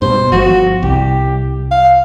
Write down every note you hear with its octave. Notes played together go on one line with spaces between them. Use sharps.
G2 B2 C5
G1 F3 F#4
C2 G4
F5